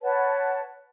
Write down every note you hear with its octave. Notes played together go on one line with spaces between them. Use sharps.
B4 C#5 F#5 A5